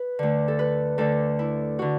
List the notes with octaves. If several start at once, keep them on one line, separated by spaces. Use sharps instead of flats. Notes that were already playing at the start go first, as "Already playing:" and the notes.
Already playing: B4
D2 D3
A4
B4
D2 D3 A4
E4
D3 F#4